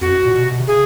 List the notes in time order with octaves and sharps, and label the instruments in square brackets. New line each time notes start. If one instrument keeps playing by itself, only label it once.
[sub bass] F2 [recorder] F#4
[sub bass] F#2
A#2
B2
C3
B2
C3
[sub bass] C#3 [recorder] G#4